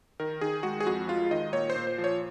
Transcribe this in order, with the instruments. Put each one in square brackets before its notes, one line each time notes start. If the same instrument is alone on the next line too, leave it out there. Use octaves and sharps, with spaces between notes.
[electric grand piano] D#3 A#4
D#3 G#4
G#3 F#4
G#4
F2 F#4
G#3 F4
D#3 D#5
A#2 C#5
C5
A#2
C5
F3
C#5